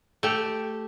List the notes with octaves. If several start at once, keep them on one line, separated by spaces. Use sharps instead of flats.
A3 G4